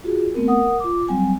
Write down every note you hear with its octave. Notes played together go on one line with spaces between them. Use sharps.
F4 F#4 G#4
A3 B3 C4 A#4
A#4 F#5 D#6
F4 D6
F#3 G3 C4 G#5